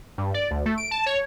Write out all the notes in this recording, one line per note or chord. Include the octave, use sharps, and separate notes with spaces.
G2
D5
D2
A3
D7
A5
C#5